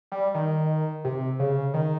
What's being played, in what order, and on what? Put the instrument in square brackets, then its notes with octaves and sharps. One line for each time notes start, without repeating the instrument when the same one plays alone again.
[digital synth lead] G3
D#3
C3
C#3
D#3